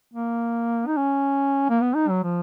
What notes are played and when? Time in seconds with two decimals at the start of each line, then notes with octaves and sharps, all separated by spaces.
0.14 A#3
0.87 D#4
0.97 C#4
1.70 A#3
1.81 B3
1.95 D#4
2.09 F#3
2.23 F3